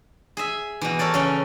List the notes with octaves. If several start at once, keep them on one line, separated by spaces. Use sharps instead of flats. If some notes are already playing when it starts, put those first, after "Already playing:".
G#4 E5
B2 E3
A4 A#4 C#5 D5
C#3 C#4 G5